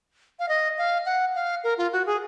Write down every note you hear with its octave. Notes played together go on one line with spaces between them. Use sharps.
F5
D#5
F5
F#5
F5
A#4
F4
F#4
G#4